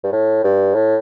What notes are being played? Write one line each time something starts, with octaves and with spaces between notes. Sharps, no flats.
G2
A2
G2
A2